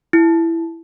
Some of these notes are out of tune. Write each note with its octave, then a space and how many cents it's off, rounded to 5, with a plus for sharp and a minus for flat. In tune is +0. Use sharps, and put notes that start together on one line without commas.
E4 +10